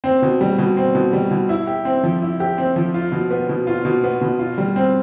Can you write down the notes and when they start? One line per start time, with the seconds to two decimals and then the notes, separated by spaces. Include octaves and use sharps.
0.04 C4
0.22 B2
0.41 G3
0.58 B2
0.77 C4
0.95 B2
1.13 G3
1.31 B2
1.49 E4
1.67 G4
1.85 C4
2.03 F3
2.22 E4
2.40 G4
2.58 C4
2.76 F3
2.94 F4
3.12 B2
3.30 B3
3.49 B2
3.67 F4
3.85 B2
4.04 B3
4.21 B2
4.39 F4
4.58 G3
4.76 C4